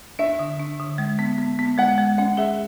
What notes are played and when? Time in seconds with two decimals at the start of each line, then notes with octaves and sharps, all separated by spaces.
0.19 D4 E5
0.39 D3
0.59 D4
0.79 D3
0.98 G#3
1.19 B3
1.38 B3
1.59 B3
1.78 G#3 F#5
1.98 G#3
2.18 C#4 F#5
2.37 G#4 E5